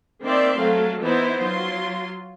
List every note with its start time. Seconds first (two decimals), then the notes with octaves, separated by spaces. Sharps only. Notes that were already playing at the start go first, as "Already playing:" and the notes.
0.24 D#3 A#3 C4 D5 E5 C6
0.58 F#3 A3 A4 F5
1.02 E3 B3 D#4 E4 C5
1.41 F#3 F4 C6